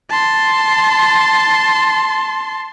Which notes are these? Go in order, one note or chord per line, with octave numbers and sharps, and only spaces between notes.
A5 C6